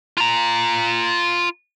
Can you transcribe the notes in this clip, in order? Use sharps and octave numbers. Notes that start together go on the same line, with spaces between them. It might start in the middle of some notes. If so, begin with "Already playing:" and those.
F4 A#5